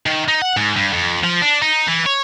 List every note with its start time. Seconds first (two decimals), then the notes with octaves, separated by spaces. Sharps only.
0.06 D#3
0.28 D#4
0.42 F#5
0.57 G#2
0.76 G2
0.93 F2
1.24 F3
1.41 D4
1.62 D#4
1.88 E3
2.06 C#5